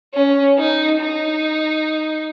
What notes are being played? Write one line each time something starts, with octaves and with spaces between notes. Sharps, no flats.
C#4
D#4
D#4